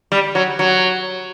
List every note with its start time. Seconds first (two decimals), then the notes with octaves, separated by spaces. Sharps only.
0.12 G3
0.35 F#3
0.59 F#3